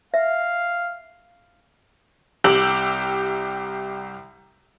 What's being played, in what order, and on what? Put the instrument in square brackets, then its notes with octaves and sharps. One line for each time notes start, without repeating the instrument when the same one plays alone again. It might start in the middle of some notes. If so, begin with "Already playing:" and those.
[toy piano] E5 [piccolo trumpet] F5
[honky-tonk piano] C2 G4 E6 F#7